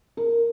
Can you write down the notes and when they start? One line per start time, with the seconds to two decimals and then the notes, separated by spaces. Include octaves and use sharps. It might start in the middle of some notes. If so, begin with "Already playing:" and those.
0.17 A#4